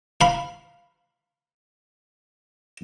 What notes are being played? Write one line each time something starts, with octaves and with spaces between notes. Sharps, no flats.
F5 B5